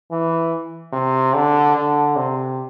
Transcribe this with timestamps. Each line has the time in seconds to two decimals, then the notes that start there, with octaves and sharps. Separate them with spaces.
0.11 E3
0.93 C3
1.35 D3
1.76 D3
2.16 C3